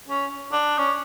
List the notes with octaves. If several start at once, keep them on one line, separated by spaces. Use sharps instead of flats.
C#4
D4
C#4